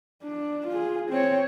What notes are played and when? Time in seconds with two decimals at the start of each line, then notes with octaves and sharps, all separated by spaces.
0.23 D4
0.67 F4 G#4
1.10 C4 C#5